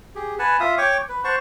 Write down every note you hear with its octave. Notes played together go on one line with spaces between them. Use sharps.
G4 G#4
B4 F#5 G#5 A5
F4 E5 F5 D#6
C#5 G5 C#6 D6
B4
C5 F#5 A5 C#6